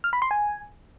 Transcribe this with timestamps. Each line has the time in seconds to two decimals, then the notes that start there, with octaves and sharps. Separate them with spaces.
0.04 F6
0.13 B5
0.22 C6
0.31 G#5